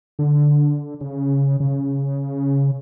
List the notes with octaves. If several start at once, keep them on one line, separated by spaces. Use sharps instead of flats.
D3
C#3
C#3